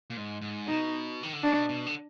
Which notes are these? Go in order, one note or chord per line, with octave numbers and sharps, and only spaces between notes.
A#2
G#2
G#2
B2 D#4
D#3
D3
B2 D4
B2
D3